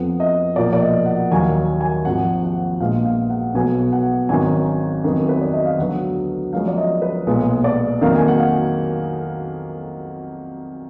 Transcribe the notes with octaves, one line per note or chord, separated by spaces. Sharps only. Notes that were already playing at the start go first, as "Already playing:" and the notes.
Already playing: F2 F3 B3 F#5
D#5
B1 A#2 F3 A#3 D5
D5
D#5
F#5
D#2 D#3 F#3 A#3 G#5
G#5
G#1 G#2 F3 F#5
F#5
A#1 A#2 G#3 B3 F5
F5
F#5
B1 B2 F#3 B3 G#5
F#5
G#1 F#2 D#3 G#5
F2 D#3 F#3 B3
B4
D5
D#5
F5
D2 D3 F#3 B3 F#5
F#2 F3 G#3 B3 F5
D5
D#5
B4
B1 A#2 G#3 B3
D5
F2 D#3 F#3 A#3 F5
G#5
F#5
F5